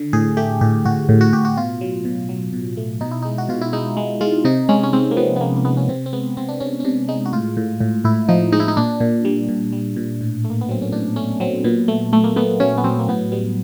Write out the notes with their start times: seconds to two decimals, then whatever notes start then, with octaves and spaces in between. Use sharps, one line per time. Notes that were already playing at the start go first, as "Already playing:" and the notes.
Already playing: D3
0.13 A2 G#4
0.37 A3 G4
0.61 A2 G4
0.85 A2 F#4
1.09 A2
1.21 F#4
1.33 A2 G4
1.45 F#4
1.57 B2 F4
1.81 F#3
2.05 B2
2.29 F#3
2.53 B2
2.77 A3
3.01 B2 D#4
3.11 E4
3.22 G#3 D#4
3.38 F#4
3.49 B2 F4
3.61 E4
3.73 G#3 D#4
3.97 G#3
4.21 G#3 F4
4.45 C3 D#4
4.69 G#3 C#4
4.83 C#4
4.93 G#3 C4
5.11 A#3
5.17 F3 B3
5.36 B3
5.41 G#3 A#3
5.57 A#3
5.65 G#3 B3
5.77 C#4
5.89 C3 C4
6.06 C4
6.13 G#3 B3
6.37 C3 C4
6.49 D4
6.60 C3 C#4
6.80 C#4
6.85 C3 D4
7.09 G#3 D#4
7.26 F#4
7.33 A2 F4
7.57 A2
7.80 A2
8.04 A2 E4
8.29 F3 D#4
8.52 G#3 D#4
8.60 E4
8.68 D#4
8.77 A#2 D4
9.00 A#2
9.25 G3
9.49 A#2
9.73 G3
9.96 A#2
10.21 A2
10.45 A3
10.50 A#3
10.61 B3
10.69 F#3 C4
10.82 C#4
10.92 A2 D4
11.16 A3 C#4
11.40 F#3 C4
11.64 A#2 B3
11.88 A3
12.13 A3
12.24 A#3
12.36 A3 B3
12.60 F#3 C#4
12.78 B3
12.84 F#3 C4
12.99 A#3
13.08 A2 B3
13.32 G3 B3